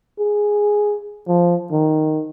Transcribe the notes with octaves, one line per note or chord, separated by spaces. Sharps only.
G#4
F3
D#3